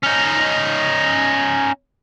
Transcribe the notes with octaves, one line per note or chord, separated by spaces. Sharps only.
C#4 D#4